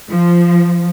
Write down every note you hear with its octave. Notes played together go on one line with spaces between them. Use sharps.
F3